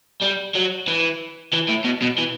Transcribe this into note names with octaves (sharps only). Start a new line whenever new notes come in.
G3
F#3
E3
E3
A2
B2
B2
E3